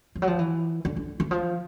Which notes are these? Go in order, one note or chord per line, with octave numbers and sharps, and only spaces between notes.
F3
F#3
F3
E3
D3
D3
E3
F3